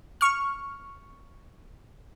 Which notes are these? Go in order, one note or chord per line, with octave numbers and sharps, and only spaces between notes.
C#6 F6